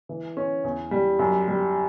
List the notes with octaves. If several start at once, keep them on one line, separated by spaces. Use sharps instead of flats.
E3
C#4
E2
G3
F#2
G3